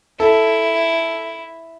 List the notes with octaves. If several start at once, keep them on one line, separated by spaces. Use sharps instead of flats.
E4 A4